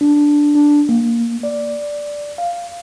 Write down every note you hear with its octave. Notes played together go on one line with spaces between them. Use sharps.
D4
D4
A#3
D5
F5